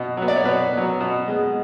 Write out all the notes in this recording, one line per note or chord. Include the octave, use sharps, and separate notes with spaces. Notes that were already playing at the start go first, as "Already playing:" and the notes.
Already playing: B2
F#3 B3
D5
C#5
B2 B4
F#3 B3
B2
G#3 B3